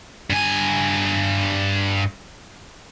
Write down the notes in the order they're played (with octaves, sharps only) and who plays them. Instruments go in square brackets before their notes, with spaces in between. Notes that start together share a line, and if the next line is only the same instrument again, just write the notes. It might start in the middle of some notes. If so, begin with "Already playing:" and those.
[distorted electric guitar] G2 G#5